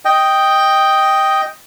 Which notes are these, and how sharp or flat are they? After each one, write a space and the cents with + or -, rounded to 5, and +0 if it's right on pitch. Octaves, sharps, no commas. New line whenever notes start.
D#5 +0 G5 +0